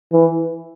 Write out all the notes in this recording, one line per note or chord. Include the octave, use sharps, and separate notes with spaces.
E3